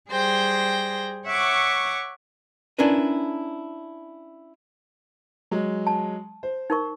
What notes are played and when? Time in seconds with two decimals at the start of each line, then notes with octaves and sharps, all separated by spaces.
0.10 G3 G#4 C5 G5 A#6
1.26 C#5 E5 F#5 C#6 D6
2.79 C#4 D4 E4 A#4 B4
5.51 F#3 G#3
5.87 A5
6.43 C5
6.70 D#4 A#4 C#6